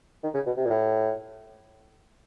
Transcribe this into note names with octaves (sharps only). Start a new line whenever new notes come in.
D#3
C#3
B2
C3
A#2
A2